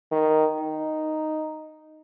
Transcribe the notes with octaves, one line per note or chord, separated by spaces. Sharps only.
D#3
D#4